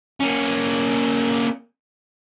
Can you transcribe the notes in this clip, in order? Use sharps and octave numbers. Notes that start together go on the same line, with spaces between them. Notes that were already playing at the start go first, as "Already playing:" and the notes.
A#3 C#4